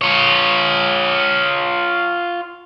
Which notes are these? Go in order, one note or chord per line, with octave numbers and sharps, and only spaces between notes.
F4 C#5